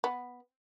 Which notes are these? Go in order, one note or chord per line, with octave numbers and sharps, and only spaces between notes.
B3